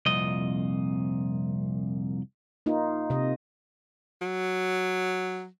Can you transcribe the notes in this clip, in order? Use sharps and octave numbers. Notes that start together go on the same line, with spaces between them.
C2 F2 A#2 D#5
A#3 D#4 F4
C3 D#5
F#3